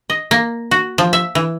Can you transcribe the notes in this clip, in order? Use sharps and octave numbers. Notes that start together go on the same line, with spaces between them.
D#5
A#3
F#4
F3
E5
E3